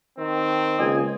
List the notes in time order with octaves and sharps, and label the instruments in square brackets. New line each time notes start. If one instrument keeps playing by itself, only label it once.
[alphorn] D#3 [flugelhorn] C4
[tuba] C#2 [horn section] A#2 D#5 G#5